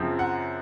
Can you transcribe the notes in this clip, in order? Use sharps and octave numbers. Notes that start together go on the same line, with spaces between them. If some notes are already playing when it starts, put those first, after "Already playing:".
Already playing: F#2 C#3 F3 C4
F#5